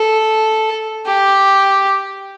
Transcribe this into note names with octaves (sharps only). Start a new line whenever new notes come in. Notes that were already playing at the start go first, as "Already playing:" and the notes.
Already playing: A4
G4